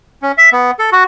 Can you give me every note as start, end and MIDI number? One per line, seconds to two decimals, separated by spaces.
0.22 0.32 61
0.38 0.50 76
0.52 0.71 59
0.79 0.90 69
0.92 1.04 66